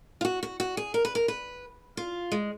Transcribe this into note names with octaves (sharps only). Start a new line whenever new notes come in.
F4
F#4
F#4
F#4
G#4
A#4
B4
A#4
B4
F4
G#3